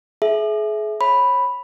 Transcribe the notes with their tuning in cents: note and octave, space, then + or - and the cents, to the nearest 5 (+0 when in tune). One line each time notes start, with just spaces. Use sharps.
G#4 +35 E5 +0
C#5 -25 B5 +0